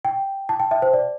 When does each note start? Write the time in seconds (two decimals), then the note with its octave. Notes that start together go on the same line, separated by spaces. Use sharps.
0.05 G5
0.49 A5
0.60 G5
0.71 E5
0.82 C5
0.93 D5